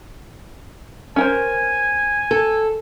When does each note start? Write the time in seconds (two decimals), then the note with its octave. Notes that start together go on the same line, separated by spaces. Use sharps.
1.16 C#4 A#4 C5 G#5
2.31 A4